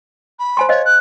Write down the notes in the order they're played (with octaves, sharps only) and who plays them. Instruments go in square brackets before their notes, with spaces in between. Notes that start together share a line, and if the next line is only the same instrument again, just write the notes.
[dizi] B5
[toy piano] C5 G#5 C6
[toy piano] C5 D#5 F5 [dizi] C#5
[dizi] F#6